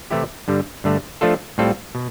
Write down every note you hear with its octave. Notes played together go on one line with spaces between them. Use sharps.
C3 E3 A3 E4 G4
G2 D3 G3
G2 D3 A3
F3 A3 D4 F4 A4
A2 G3 C4 F4 A4
B2